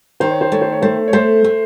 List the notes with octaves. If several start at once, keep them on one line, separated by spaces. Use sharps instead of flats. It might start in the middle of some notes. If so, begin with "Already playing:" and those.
D#3 C5
C#5
C5
A3 C#5
C5
C#5
A3 C5
C#5
A3 C5
A3